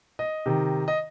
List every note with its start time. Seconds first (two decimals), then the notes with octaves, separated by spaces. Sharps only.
0.19 D#5
0.46 C3 D#3
0.88 D#5